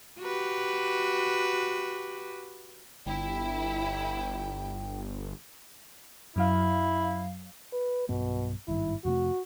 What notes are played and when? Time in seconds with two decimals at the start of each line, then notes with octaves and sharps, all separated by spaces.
0.20 F#4 G4 B4
3.06 G1 E4 G5
6.36 F#2 F#3 E4 F5
7.73 B4
8.09 B1 G2 B2 B3
8.68 G#1 G2 D#3 E4
9.05 F2 C3 A3 F#4